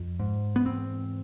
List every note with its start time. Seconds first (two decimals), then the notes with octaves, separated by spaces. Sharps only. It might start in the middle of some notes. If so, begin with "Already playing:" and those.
Already playing: F2
0.20 G#2
0.56 B3
0.66 E2 C4